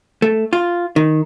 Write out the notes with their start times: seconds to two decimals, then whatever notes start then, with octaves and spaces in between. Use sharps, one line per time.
0.22 A3
0.53 F4
0.96 D#3